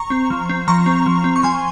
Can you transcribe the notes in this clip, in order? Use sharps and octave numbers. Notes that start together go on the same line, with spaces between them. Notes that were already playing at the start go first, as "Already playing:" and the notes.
Already playing: A#5 C#6
C4
F3
C4
F3 A#5 C#6
C4
F3
C4
C#6
F3 G#5 C6